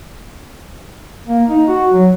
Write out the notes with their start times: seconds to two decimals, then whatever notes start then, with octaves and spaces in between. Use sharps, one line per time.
1.27 A#3
1.49 D#4
1.68 F#4
1.93 F#3